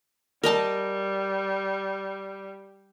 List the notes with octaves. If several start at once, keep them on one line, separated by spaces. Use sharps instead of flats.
G3 A#4 D#5 A5